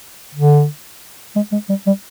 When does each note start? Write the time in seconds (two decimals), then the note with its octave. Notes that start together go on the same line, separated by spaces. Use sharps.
0.35 D3
1.36 G#3
1.52 G#3
1.69 G3
1.87 G3